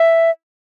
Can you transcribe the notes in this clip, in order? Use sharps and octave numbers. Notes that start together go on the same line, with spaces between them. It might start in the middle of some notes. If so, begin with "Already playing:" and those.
Already playing: E5